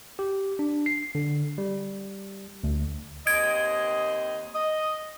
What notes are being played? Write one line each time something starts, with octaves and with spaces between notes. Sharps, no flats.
G4
D4
C7
D3
G3
D2
D#2 C4 D#5 G#6 D7
D#5